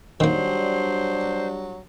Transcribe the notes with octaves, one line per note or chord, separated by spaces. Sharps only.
D#3 F#3 G3 A#3 D4 C5